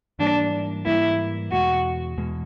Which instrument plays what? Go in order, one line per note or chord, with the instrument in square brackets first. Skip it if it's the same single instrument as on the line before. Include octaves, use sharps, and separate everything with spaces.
[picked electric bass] G#2 E3 G3 A#3 [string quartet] D4
[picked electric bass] G#2 E3 G3 A#3 [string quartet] E4
[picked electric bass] E2 B2 G#3 [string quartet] F#4
[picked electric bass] E2 B2 G#3